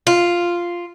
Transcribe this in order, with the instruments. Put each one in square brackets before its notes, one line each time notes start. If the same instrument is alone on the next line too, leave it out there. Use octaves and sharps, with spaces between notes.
[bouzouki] F4